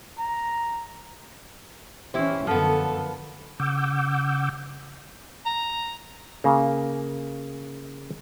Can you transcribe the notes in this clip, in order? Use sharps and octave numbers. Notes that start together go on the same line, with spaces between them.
A#5
E3 C#4 E4 G4 C5
F#2 D3 F3 B3 A4
C#3 F#5 D6 E6 G6
A#5
C#3 A#3